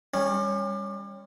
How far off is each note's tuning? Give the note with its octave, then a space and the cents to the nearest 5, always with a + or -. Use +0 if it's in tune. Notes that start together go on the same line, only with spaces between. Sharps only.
G3 +35 C#4 +0